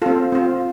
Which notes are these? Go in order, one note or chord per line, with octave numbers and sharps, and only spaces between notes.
C4 F4 A4
C4 F4